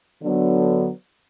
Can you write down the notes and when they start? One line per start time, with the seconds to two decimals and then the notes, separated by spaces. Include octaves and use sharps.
0.22 D3 F#3 B3